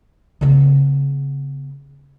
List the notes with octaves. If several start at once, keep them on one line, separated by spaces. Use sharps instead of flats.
C#3 B3